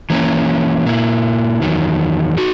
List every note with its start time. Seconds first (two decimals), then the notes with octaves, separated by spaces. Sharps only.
0.10 E3 A#3 C#4
0.86 A#2 A#3 E4
1.61 E2 D#3 F#3
2.38 D#4 F#4